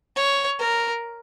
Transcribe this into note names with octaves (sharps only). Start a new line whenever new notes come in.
C#5
A#4